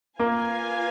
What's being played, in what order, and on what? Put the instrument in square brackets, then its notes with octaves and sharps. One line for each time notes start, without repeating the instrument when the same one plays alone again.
[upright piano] A#3 [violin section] F4 B4 F5 G#5